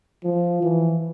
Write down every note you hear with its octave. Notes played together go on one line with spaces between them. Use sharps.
F3
E3